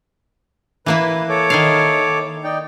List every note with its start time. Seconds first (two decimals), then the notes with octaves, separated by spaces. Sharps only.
0.86 E3 A#3 E4 B4
1.29 A4 C#5 D6
1.50 D#3 E4 F5
2.44 D#4 D5 G5